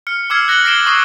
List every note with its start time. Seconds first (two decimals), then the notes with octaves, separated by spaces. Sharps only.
0.07 F6 C#7
0.30 D6 E6 F6 G#6 C7 C#7
0.48 F#6 A#6 C#7 F#7 G7
0.65 A#6 C7 D7 E7 G7
0.86 C#6 D#6 A#6 C7